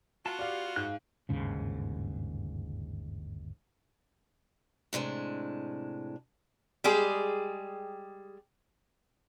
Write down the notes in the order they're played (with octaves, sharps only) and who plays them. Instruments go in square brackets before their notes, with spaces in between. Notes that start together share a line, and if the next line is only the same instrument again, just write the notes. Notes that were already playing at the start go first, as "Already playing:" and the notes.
[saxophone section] B3 F4 F#4 [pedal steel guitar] A5
[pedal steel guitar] G4 [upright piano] D5 F5
[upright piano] G#2 [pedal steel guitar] F5 F#6
[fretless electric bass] G1 D#2 G#2 C#3
[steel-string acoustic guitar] A2 C3 G#3 D4
[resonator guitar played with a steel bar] G3 G#3 G4 G#4